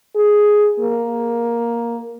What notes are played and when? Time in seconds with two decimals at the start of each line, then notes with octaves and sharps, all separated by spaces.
0.16 G#4
0.80 A#3